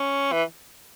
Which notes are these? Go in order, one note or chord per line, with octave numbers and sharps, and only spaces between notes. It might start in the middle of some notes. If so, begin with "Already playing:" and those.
Already playing: C#4
E3